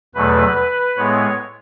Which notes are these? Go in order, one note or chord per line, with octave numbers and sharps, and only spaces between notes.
E2 B2 F#3 A3 B4
A2 G#3 B3 C#5